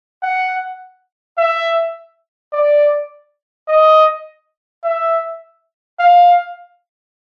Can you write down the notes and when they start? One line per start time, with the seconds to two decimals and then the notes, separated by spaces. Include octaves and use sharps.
0.23 F#5
1.38 E5
2.53 D5
3.68 D#5
4.84 E5
5.99 F5